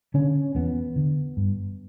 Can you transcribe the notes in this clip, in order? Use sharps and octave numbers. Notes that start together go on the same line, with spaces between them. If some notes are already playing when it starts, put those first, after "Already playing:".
D3 C#4
E2 B3
D3
G2